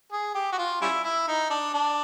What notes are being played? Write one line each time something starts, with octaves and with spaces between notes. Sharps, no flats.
G#4
G4
F#4
F4
G3 C#4 E4
E4
D#4
D4
D4